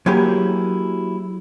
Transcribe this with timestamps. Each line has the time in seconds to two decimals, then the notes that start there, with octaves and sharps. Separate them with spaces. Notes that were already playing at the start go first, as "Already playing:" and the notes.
0.06 F#3 A#3 E4 G4 G#4